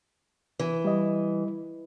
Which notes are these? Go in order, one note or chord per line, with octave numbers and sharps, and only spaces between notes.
E3
G3 D#5